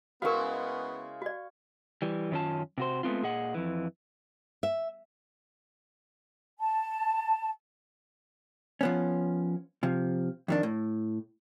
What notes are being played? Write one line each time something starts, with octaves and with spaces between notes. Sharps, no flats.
C#3 G#3 B3 E4 F#4 A#4 F5 C#6
F#4 D5
E3 G3
F#2 D#3 C#4 F4 A5
C3 F#4 C5
G#3 A3 B3 C4 F4
A#2 G#4 D#5 F#5
F2 E3
E5
A5
F3 B3 C#4
C3 F3
F2 D#3 D4
A2